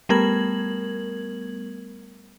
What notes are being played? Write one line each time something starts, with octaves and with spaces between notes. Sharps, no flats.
G3 A3 B3 A#4 G#6 F#7